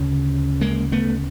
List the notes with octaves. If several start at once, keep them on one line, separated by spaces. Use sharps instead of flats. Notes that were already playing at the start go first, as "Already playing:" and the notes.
Already playing: D2 C#3
G#3 A#3
A3 B3